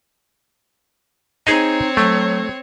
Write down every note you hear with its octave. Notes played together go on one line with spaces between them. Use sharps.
C4 D#4 G#4 C5 C#5 D#5
F#3 A3